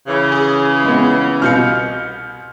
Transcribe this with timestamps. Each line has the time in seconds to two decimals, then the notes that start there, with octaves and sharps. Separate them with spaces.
0.07 C#3 E3
0.32 G#4
0.84 G#3 B3
1.42 C2 B2 F5 F6 G6 C#7